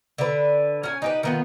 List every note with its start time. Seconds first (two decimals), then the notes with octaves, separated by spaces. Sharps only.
0.18 D3 B4
0.83 C#4 G#5
1.02 D#4 G4 B4
1.23 D#3 B3 F4